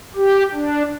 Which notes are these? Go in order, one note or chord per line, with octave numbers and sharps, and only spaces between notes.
G4
D4